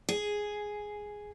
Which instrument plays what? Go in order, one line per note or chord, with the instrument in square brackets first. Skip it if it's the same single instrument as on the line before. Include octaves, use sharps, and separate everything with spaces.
[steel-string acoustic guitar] G#4